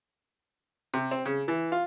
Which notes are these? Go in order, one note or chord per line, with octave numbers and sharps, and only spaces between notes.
C3
C4
C#3
E3
F4